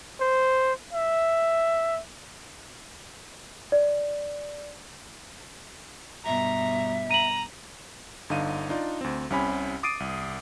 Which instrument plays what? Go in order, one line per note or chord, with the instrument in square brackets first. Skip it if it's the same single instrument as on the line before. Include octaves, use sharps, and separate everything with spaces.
[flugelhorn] C5
E5
[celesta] D5
[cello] G2 B2 [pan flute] E5 [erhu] A#5
[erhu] A#5 [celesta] D#7 F#7
[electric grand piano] G1 D3 D#4 F5 D#7
D4 D#4 F4 D5
D2 C4
C2 C3 C#4 G#5 B5
D6 D#6 A6 C7 D7 D#7
C2